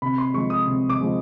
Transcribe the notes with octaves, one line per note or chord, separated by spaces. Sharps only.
C3 B5
C6
F3 G#3 C#6
D#6
C3
D6
F3 G#3